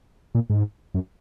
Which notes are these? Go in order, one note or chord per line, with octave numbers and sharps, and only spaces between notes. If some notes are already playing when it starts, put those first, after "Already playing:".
A#2
G#2
F#2